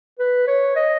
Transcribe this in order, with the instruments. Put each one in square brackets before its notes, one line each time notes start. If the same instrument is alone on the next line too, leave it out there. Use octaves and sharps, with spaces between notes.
[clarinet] B4
C#5
D#5